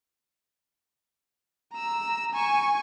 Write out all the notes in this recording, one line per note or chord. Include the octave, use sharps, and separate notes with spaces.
A#5 E6
G#5 C#6